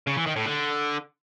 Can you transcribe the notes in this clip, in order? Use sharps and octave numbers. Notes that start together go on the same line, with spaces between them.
C#3
E3
D#3
A2
D3